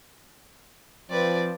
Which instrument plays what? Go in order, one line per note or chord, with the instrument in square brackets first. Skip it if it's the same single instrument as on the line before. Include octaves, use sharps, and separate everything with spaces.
[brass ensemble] F3 C4 [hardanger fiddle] B4 D5